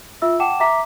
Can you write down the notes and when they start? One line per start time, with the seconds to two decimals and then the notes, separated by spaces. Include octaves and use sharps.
0.22 F4 E5 E6
0.40 F#5 G5 A5 D6 E7
0.60 E5 A#5 D6 B6